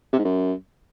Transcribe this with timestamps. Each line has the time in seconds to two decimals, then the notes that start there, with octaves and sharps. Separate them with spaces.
0.13 C3
0.19 G#2
0.25 F#2